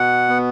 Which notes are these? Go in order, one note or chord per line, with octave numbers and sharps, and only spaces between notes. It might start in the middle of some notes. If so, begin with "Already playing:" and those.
Already playing: B2 F#5
B3